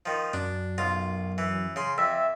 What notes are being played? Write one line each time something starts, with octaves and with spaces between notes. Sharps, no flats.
D#3 F3
F#2 D4
B1 F4
E3
C#3 C6
F2 E5